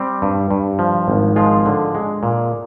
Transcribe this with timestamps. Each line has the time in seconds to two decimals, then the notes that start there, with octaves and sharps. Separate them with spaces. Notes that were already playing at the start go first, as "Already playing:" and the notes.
Already playing: G3 C4 G4
0.22 G2
0.51 G2
0.79 F3
1.08 G#1
1.36 F3 G#3 F4
1.66 D3
1.95 G#3
2.23 A#2